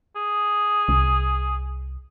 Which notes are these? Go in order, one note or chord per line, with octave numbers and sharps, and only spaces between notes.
G#4
C2